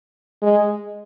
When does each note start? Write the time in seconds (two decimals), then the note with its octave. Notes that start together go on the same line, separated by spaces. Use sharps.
0.42 G#3